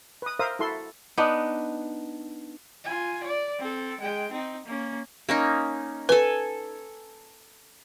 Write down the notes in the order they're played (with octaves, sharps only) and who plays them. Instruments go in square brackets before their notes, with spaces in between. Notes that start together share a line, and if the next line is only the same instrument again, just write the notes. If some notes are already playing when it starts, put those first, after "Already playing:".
[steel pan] B4 D#6
A#4 C5 E5 F5 D#6
E4 F#4 A4 C6
[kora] B3 D4 D#4
[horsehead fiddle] F4 G#5
D5
C4 A4
G#3 G5
C4 D#4
A#3 C#4
[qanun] A#3 C#4 D#4
[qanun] A4 G#5 [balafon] B4